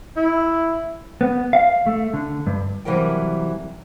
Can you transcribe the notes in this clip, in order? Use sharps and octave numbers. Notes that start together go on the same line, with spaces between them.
E4
B3
F5
A3
D3
G2
C3 E3 F#3 G3 A#4 G5